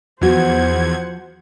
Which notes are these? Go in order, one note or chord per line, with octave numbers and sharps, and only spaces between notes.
E2 F3 F#4 C5 F#5 G#6